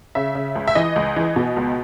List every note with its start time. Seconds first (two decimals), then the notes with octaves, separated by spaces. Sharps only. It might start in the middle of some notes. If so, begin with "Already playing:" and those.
0.15 C#3 E5
0.35 C#3
0.55 C#2
0.68 E5
0.75 E3 D#5
0.96 C#2
1.16 E3
1.36 B2
1.57 C#2